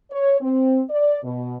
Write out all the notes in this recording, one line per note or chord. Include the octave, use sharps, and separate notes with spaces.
C#5
C4
D5
B2